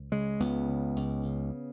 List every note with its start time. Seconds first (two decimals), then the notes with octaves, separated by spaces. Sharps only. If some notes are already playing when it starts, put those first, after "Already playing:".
Already playing: C#2
0.12 C#3 G#3
0.40 C#2 B3
0.69 C#3
0.96 C#2
1.25 C#3